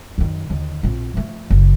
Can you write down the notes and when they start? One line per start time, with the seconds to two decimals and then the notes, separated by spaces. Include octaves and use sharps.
0.18 F#2 D#3
0.50 D#2 D3
0.83 A#1 C4
1.14 F3 A3
1.50 F#1